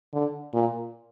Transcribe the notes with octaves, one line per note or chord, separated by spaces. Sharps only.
D3
A#2